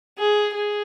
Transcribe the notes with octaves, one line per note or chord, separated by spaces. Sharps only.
G#4
G#4